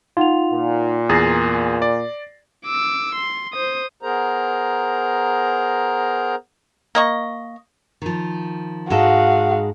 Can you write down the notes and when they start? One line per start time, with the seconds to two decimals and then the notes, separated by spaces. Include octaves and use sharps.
0.17 D#4 F4 F#5 F7
0.53 A#2
1.09 E2 G#4 A6 A#6 C7
1.82 D5
2.65 D6 E6
3.15 C6
3.53 C5 D#6
4.03 B3 G#4 A#4 C5 A#5
6.95 A#3 D#5 C#6
8.02 D#3 F3
8.90 G#2 G#3 F#4 A4 F5